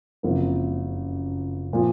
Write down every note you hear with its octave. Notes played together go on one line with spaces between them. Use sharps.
F#1 F2 C#3 F3 A#3
A#2 F3